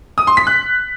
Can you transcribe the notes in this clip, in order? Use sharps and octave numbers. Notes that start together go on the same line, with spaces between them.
D#6
C6
B6
F#6